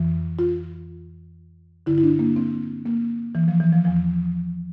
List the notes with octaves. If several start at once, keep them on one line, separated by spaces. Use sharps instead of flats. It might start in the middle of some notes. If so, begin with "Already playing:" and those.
Already playing: F2 E3
F4
G2 D3 E4
E4
D4
A#3
C4
A#3
E3
F3
E3
F3
E2 E3 F3